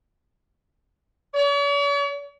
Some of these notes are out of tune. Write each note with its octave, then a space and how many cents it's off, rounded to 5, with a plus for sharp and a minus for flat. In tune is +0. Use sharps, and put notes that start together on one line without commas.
C#5 +45